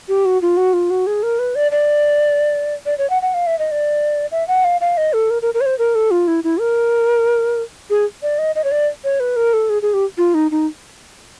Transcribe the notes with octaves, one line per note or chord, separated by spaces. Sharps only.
G4
F#4
F4
F#4
F4
F#4
G#4
A#4
B4
D5
D5
D5
C#5
F#5
F#5
F5
E5
D#5
D5
E5
F#5
F5
F5
D#5
A4
A#4
A#4
A#4
C#5
C5
A#4
A4
F4
E4
E4
A#4
G#4
D5
D#5
D#5
C#5
D5
C#5
B4
A#4
A4
G#4
G#4
G4
F4
D#4
D#4